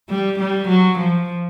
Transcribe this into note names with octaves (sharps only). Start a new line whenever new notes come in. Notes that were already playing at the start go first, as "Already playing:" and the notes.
G3
G3
F#3
F3